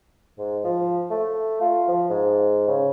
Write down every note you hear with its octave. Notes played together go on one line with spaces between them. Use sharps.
G#2
F3
A3
F4
F3
G#2
C#3